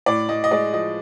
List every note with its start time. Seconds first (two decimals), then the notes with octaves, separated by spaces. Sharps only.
0.06 A2 D5
0.29 A2 D#5
0.44 D#5
0.51 G#3 D5
0.73 F3 D#5